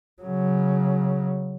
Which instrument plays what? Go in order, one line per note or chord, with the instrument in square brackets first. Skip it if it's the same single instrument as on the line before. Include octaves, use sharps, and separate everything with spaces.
[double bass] C#3 F#3